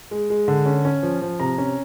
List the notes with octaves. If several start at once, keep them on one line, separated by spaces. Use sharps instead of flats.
G#3
G#3
D3
C#4
C#4
F3
F3
C3 A#5
C#4